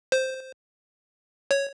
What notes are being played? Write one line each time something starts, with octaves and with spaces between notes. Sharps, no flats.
C5
C#5